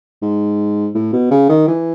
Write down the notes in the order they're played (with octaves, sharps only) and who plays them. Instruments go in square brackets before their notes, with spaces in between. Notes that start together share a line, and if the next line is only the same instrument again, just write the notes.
[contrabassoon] G#2
A2
B2
C#3
D#3
E3